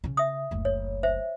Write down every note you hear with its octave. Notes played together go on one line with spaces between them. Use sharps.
C#3 C#4
E5 D#6
F#1 D2
C#5
C5 E5